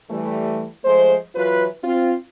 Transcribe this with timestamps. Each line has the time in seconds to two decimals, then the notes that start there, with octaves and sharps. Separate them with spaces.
0.10 E3 G3 A3
0.85 F3 G#3 A3 C5
1.35 E3 F#3 F4 B4
1.84 C4 F4